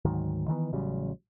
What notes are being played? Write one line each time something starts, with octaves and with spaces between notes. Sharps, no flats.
D2 G#2 D#3 F#3
D#3 E3 A3 B3
A1 C#3 F#3 G3